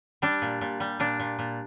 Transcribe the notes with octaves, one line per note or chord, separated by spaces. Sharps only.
G3 D4
A#2
A#2
G3
A#2 D4
A#2
A#2